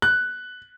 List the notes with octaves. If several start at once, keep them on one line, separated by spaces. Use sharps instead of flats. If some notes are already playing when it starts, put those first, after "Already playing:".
F#6